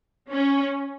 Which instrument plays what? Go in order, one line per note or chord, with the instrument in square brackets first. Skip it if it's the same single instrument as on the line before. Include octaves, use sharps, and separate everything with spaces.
[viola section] C#4